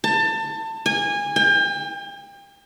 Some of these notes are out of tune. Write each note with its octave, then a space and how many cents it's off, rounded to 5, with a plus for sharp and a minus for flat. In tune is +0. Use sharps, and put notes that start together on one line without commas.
A5 +25
G#5 -25
G5 +35